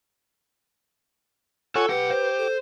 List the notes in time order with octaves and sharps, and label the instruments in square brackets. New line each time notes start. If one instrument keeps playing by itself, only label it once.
[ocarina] F4 [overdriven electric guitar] A4 [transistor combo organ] C#5 F#5 G#5
[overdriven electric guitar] B1 F#5 [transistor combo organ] G4 [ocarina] B4
[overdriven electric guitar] C5
[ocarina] A4